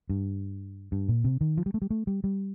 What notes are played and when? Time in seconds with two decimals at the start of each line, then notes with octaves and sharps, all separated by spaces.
0.09 G2
0.92 G2
1.09 A#2
1.24 C3
1.41 D#3
1.57 F3
1.66 G3
1.74 A3
1.82 G3
1.90 A3
2.07 G3
2.24 G3